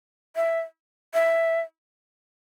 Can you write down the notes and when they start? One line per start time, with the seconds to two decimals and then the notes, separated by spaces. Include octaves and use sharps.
0.36 E5
1.14 E5